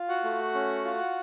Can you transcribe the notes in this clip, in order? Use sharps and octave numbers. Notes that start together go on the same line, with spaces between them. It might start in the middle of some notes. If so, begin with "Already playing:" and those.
Already playing: F4
F#4 F#5
A3
C#4
F4